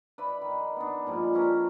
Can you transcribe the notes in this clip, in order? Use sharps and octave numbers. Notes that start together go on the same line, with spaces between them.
B4 D5 E5 B5
D#3
B3 D4
A#2 F3 G3 G#3
C4 C#4 A#4 B4